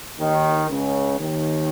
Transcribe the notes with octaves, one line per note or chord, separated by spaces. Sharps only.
D#2 D#3
C#2 C#3
D#2 D#3